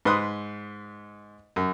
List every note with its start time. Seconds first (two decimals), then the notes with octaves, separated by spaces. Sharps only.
0.05 G#2 B4 C6 D#6 F#6
1.56 F#2